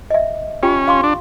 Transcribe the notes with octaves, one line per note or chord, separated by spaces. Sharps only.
D#5 E5
C#4 F4 G4 G5
F5 C6 C#6
D4